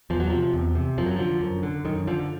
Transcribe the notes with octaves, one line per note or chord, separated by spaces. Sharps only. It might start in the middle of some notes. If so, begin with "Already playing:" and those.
E2 F3
F#3
C3 F3
E2
C3
F#2 F3
F#3
D3 F3
F#2
D3
F#2 D#3
D3 F3